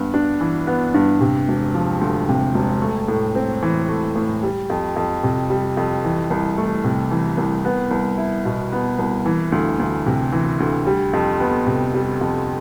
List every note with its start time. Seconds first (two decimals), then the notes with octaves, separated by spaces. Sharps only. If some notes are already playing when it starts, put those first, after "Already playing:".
Already playing: G2 B3
0.14 D4
0.41 E3
0.67 B3
0.94 G2
1.21 C3
1.48 E1
1.74 F3
2.01 D2
2.29 C3
2.54 E1
2.82 A3
3.08 A2
3.35 C4
3.63 E3
3.89 A3
4.15 A2
4.43 G3
4.70 F2
4.96 F2
5.23 C3
5.50 G3
5.77 F2
6.04 E3
6.30 C2
6.58 A3
6.84 C3
7.11 E3
7.37 C2
7.65 B3
7.91 C2
8.18 E4
8.45 B2
8.72 B3
8.99 C2
9.26 E3
9.52 D2
9.80 D2
10.06 C3
10.32 E3
10.60 D2
10.87 G3
11.13 F2
11.40 B3
11.66 C3
11.94 G3
12.21 F2